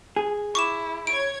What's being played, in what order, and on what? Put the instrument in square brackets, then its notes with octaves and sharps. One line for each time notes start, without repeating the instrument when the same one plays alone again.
[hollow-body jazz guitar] G#4
[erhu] E4 [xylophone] C#6 D6 E7
[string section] C#5 G#6 [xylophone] D7